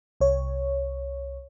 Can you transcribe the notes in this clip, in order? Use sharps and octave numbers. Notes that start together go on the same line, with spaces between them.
C2 C#5